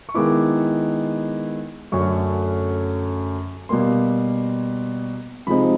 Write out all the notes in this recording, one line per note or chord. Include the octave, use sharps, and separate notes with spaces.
C#6
D#3 G#3 B3 E4 D6
F#2 D3 F#3 A3 C#4 C#6
B2 G3 A#3 C6
C3 F3 G#3 C4 D#4 B5